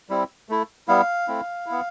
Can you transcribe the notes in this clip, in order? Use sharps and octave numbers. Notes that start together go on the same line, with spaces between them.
G3 C4 E4
A3 E4
G3 B3 E4 F5
A3 C4 E4
B3 E4